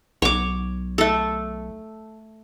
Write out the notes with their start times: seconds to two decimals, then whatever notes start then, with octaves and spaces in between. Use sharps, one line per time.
0.22 B1 C#5 D6
0.98 A3 A4